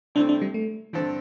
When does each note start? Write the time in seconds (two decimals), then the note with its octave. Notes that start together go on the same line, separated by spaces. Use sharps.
0.15 C2 C3 A3 C4 D4 E4
0.29 D4
0.42 G3
0.54 A3
0.93 G2 D3 E3 C4 A4